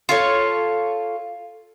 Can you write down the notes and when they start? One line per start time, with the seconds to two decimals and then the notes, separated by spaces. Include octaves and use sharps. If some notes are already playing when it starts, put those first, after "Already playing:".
0.09 F4 A4 C#5